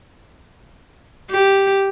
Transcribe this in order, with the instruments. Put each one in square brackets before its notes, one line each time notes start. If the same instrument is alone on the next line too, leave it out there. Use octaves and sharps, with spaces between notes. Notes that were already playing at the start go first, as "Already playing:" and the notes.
[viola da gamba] G4